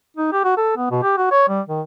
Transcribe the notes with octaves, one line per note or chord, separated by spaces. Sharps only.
D#4
G4
F#4
A4
B3
B2
G4
F#4
C#5
G3
D#3